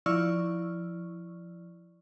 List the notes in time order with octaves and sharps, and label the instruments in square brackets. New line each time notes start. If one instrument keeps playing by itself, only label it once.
[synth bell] F3 E4 D5 C#6 E6 F6